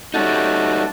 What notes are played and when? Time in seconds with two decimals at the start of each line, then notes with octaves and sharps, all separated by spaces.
0.14 G3 A3 C#4 D#4 F#4 D5